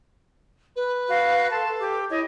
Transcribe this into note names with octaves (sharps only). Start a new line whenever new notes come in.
B4
F#4 F5 F#6
A4 B4 A5 C6
A4
G4 D6
E4 C#5 D#5